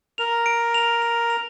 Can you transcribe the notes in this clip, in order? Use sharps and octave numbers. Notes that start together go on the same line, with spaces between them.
A#4 F7
D7
F7
F7
F7